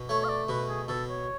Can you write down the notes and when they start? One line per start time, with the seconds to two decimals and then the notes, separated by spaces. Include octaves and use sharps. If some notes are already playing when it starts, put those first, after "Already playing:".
Already playing: B2
0.09 A3 C#5
0.24 F5
0.29 D5
0.49 B2 B4
0.68 G#4
0.88 B2 A4
1.09 C#5